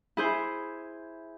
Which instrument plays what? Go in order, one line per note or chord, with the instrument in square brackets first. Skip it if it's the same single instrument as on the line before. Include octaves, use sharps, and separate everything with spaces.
[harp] E4 G#4 C5